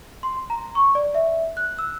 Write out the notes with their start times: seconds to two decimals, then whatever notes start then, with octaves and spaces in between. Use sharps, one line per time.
0.23 C6
0.50 A#5
0.75 C#6
0.95 D5
1.15 E5
1.57 F#6
1.78 E6